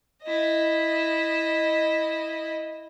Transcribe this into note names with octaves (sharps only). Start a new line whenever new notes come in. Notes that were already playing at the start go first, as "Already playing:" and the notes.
E4 D#5